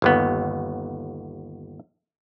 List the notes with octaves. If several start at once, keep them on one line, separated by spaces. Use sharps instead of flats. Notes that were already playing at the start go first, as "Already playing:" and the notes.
G1 D#2 B3